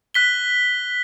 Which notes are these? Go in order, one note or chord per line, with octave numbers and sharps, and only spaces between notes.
F#6 B6 G7